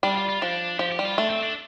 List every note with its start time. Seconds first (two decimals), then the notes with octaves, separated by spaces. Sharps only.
0.03 G3 D4
0.16 F4
0.29 F4
0.42 F3 D4
0.79 F3 G4
0.92 G4
0.99 G3
1.05 F4
1.17 A3 D4
1.30 C4
1.42 D4